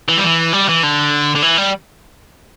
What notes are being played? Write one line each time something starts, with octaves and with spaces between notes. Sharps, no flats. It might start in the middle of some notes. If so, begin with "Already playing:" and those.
E3
G3
E3
G3
E3
D3
D3
E3
G3